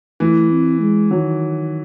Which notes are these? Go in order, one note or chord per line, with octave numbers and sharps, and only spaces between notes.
E3 A3
C4
G#3
D#3 F#3